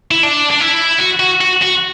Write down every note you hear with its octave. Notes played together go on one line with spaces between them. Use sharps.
E4
D4
D4
E4
F#4
F#4
F#4
F#4